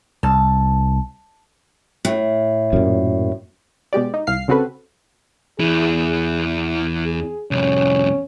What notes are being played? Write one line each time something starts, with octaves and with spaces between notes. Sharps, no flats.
C2 A5
A2
F#2 A#2
B2 G#3 G4 D5
D#4
C2 F5 F6 C7
C#3 C4 F#4 A4 B4
E2 E3 G#4
G#4
C2 F2 C#4